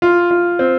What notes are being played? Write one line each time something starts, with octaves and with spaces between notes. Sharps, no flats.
F4
F4
C4